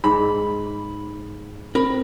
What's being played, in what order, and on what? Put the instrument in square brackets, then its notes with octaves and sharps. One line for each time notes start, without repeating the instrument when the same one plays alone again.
[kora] G#2 [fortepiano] B5
[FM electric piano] C4 [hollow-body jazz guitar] A#4 B5